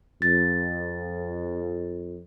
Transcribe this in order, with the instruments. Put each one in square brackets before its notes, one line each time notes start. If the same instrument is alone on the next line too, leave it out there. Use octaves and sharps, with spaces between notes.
[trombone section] F2 [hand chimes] A6